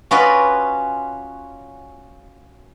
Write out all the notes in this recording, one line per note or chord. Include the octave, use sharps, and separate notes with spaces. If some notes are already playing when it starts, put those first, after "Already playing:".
C#4 F4 F#4 B4 D5 D#5